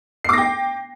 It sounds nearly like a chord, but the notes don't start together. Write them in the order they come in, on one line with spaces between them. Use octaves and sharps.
C7 D6 A#6 G5